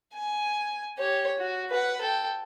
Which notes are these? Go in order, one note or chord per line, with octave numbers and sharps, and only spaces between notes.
G#5
G4 C#5
F#4
B4 F#5
A4 G5